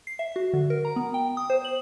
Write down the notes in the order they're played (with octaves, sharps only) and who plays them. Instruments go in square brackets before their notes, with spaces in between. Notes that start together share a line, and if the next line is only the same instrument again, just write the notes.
[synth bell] C7
E5
F#4
D3
A#4
A#5
B3
G5
D#6
C5
F#7